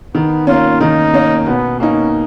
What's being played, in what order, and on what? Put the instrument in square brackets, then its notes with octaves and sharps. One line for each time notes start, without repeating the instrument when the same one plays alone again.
[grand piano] D#3 [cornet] B3
[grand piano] A#3 C#4 [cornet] F4
[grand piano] D#3 [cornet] D#4
[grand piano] A#3 C#4
[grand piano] B2 [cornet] B3
[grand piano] A#3 D#4 [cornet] C#4